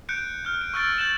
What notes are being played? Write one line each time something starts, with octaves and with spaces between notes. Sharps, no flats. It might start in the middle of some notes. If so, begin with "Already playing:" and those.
F#6 G6 C#7 D7
F6 G6
D7
C#6 E6 F#6 G6 A6 D7
G6 A6 E7 F#7